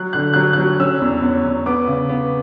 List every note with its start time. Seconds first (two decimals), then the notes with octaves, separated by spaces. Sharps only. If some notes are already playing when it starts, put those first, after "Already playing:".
Already playing: F#3 F#6
0.13 D3 F#6
0.34 F#3 F#6
0.53 F#3 F#6
0.80 C#4 E6
1.01 E2
1.22 E2
1.45 E2
1.66 B3 D6
1.88 C#3
2.09 B3